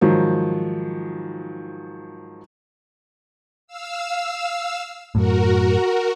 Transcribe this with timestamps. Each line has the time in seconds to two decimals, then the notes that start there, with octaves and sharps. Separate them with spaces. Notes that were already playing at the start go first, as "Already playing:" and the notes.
0.01 G#2 D#3 F3 F#3
3.67 F5 E6
5.15 F#2 A2 F#4 A#4